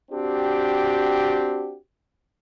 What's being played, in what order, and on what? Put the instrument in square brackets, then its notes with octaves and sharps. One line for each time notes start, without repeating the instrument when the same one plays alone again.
[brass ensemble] C4 D4 F#4 G4